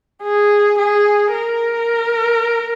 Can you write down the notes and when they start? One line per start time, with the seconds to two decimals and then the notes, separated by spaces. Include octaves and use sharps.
0.23 G#4
0.78 G#4
1.33 A#4